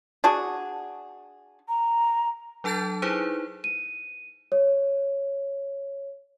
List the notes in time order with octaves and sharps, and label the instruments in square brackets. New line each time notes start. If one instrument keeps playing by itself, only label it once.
[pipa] D4 F#4 G#4
[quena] A#5
[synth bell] F#3 D4 A4 A5 G6 A6
D#4 E4 G#4 B4 C5
[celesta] D#7
C#5